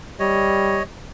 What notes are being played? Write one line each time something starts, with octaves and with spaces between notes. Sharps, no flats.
G3 C#5 D#5